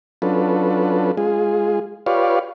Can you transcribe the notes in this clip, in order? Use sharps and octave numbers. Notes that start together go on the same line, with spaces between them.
F#3 C#4 D4 F4 A4 B4
G#3 F4 G#4
F4 G4 B4 C#5 D5 F5